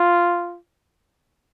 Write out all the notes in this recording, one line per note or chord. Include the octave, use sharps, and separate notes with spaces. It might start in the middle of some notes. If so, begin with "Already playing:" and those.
Already playing: F4